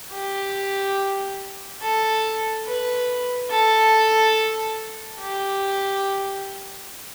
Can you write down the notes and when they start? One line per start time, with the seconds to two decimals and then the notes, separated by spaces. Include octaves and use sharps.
0.12 G4
1.82 A4
2.67 B4
3.51 A4
5.20 G4